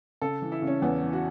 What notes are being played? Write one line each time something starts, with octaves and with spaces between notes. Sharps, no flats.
C#3 A4
E3
E4
C#3
C#4
E2 B3
E3
F#4